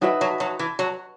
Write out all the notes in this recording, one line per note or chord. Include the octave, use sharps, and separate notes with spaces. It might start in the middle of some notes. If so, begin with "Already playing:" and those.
F#3 D#4 F#4 B4 E5
F#3
F#3
E3
F#3